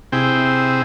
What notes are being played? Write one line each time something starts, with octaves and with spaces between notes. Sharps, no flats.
C3 C4 E4 G#4 G5